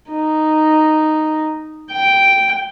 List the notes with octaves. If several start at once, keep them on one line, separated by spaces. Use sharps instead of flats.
D#4
G5